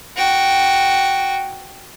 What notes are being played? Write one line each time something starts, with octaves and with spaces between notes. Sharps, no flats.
F#4 G5